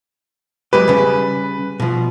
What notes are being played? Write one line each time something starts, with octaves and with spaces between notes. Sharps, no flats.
F#3 G#3 G4 B4
C#3 G3
B2 F3